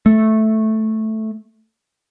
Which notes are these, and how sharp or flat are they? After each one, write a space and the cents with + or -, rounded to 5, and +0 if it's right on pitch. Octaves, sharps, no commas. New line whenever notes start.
A3 -5